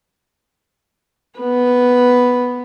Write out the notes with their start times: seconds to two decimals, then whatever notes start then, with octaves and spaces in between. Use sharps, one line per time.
1.39 B3 B4